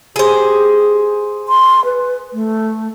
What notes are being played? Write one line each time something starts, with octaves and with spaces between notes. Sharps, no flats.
G4 G#4 C5
C6
B4
A3